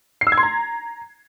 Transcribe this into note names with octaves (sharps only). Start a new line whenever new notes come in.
C7
E6
G#6
C6
A#5